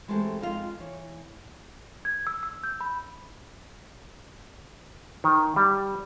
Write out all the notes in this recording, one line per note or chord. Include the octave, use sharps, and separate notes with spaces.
E3 G#3 A3 C4 G4 A4
F2 D#3 G#3 F4 A4 F5
E3 C#5
G#6
E6
E6
G6
B5
D#3
G3